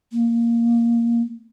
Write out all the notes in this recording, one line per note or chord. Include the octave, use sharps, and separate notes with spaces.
A#3